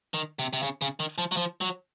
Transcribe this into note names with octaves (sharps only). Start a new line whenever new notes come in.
D#3
C3
C3
C#3
C#3
D#3
F3
F#3
F3
F#3